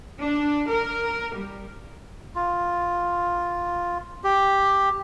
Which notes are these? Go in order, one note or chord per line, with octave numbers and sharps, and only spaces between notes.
D4
A#4
G3
F4
G4